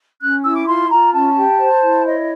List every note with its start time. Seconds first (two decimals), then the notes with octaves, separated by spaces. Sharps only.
0.20 C#4 F#6
0.43 E4 E6
0.55 D6
0.66 F4 C6
0.90 F4 A#5
1.12 C#4 A5
1.36 G4
1.59 C5
1.82 E4
2.05 C#5 D#5